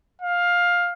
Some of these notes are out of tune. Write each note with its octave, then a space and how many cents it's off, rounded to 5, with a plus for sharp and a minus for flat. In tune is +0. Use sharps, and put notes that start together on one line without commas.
F5 +15